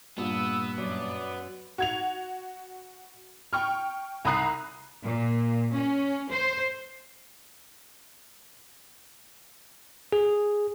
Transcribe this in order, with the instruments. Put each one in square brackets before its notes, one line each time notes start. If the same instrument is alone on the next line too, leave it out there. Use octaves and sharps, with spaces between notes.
[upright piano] G2 A#2 [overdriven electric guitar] B3 [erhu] E6
[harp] F#2 [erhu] D5
[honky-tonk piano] F#4 G#6 F7
G5 C#6 F6
C2 A#5 B5 D#6 F#6 C7
[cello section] A#2
C#4
C5
[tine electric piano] G#4